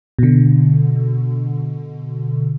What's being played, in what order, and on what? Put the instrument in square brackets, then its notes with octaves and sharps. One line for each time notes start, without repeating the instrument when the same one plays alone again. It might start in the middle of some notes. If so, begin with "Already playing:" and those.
[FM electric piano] B2 D3